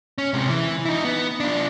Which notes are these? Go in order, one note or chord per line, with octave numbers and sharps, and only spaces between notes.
C#4
C3 G#3
E3
D#4 E4
B3
D4 F4